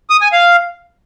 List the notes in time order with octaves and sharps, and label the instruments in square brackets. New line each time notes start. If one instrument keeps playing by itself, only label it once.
[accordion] D#6
G#5
F5